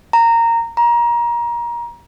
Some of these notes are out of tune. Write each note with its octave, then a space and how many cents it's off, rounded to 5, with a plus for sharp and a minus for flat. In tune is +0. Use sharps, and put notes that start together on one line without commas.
A#5 -15
A#5 +25